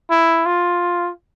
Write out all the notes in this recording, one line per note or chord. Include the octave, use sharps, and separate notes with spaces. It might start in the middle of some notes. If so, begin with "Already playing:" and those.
E4
F4